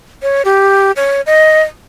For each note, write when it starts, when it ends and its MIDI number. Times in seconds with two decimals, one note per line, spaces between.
0.23 0.42 73
0.45 0.92 67
0.96 1.21 73
1.26 1.62 75